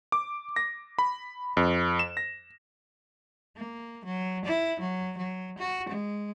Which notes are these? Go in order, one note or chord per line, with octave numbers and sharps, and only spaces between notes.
D6
A#6
B5
F2
E7
A#6
A#3
F#3
E4
F#3
F#3
F#4
G#3